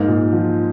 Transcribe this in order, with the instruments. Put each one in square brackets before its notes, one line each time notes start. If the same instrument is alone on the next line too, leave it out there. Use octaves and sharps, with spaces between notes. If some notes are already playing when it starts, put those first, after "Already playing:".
Already playing: [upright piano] G#2 [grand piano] A#3
[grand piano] A#2
F3